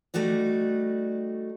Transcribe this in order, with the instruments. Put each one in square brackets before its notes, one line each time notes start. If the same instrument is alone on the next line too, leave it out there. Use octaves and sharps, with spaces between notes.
[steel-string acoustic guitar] G3 A3 D#4 F#4 D5